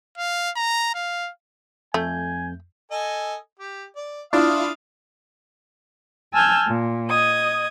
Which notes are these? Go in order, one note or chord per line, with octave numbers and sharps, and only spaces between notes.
F5
A#5
F5
F2 A3 G#5 G6
A4 D#5 G#5
G4
D5
D4 E4 F4 F5 D#6 F6
G#5 A5 E6 F6 G6 G#6
A#2
D#5 D#6 G#6